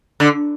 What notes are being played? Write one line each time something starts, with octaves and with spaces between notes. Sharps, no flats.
D3